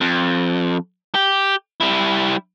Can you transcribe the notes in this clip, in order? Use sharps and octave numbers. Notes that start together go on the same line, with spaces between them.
F2
G4
G3 E4